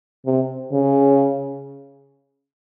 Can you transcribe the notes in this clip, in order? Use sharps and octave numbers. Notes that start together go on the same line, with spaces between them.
C3
C#3